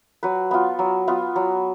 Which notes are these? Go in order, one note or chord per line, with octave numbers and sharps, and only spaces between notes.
F#3 B4
B3 F4
F#3
B3 F4
F#3